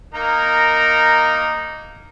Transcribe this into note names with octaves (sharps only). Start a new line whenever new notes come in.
A#3 D#4 A#4